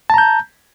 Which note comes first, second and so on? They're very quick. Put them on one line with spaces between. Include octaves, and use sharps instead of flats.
A5 A#5 G6